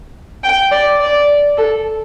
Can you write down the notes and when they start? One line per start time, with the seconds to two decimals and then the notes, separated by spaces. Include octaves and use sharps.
0.44 G5
0.72 D5
1.01 D5
1.57 A4